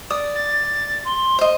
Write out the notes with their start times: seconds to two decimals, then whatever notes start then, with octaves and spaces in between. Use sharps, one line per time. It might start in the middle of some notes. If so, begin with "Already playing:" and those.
0.10 D5 D#6
0.35 A6
1.05 C6
1.39 C5 D#5